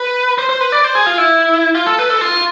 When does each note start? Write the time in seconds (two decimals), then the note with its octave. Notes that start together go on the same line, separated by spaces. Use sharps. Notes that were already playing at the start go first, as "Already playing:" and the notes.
Already playing: B4
0.38 C5
0.49 C5
0.61 B4
0.72 D5
0.84 C5
0.95 G#4
1.06 F4
1.18 E4
1.75 F4
1.86 A4
1.99 B4
2.10 A4
2.21 F4